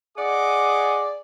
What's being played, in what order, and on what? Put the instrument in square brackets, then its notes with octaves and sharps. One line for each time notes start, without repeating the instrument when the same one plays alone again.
[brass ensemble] G#4 D#5 [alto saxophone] D5 [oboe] F#5 [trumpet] D6